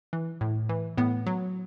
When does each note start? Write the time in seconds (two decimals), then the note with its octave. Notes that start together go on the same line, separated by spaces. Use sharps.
0.13 E3
0.41 A2
0.69 E3
0.97 A2 B3
1.27 F#3